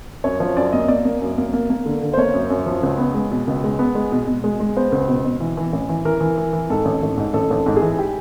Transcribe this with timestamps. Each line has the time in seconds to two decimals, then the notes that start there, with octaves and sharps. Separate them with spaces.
0.24 F#2 C#5
0.40 F3 C#5
0.57 F#2 D5
0.73 A#3 D#5
0.88 A#3 D5
1.05 A#3
1.22 F#2
1.38 A#3
1.53 A#3
1.70 A#3
1.86 D3
2.01 D3
2.13 C5
2.17 A#3 C#5
2.34 F#2
2.50 F#2
2.66 F3
2.83 C#2
2.98 B3
3.14 G#3
3.31 B2
3.47 C#2
3.64 G#3
3.79 B3
3.95 G#3
4.12 B2
4.27 B2
4.44 G#3
4.60 G#3
4.76 B3 C5
4.92 C#2
5.08 B2
5.24 B2
5.40 E3
5.57 E3
5.73 A1
5.89 E3
6.05 E3 A#4
6.21 E3
6.38 E3
6.53 E3
6.70 G#2 A4
6.85 A1
7.02 A1
7.17 G#2
7.33 A1 A4
7.50 A1
7.56 A4
7.66 G#2
7.76 G#4
7.82 E3
7.99 G4